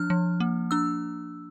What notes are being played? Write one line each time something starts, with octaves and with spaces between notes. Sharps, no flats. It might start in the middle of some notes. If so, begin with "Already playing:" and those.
Already playing: F3 D4 F6
F3
A#3
D4 E6